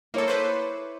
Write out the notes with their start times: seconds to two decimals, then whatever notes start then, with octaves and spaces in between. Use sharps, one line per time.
0.14 A#3 E4 A4 C#5 D6
0.28 B4 C5